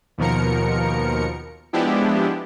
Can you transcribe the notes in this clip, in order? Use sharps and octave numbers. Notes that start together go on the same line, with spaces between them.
D#2 B2 F3 A#4 C#7
F3 G#3 B3 D4 E4 G4